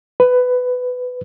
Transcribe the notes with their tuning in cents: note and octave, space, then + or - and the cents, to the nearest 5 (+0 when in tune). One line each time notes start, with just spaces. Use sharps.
B4 +15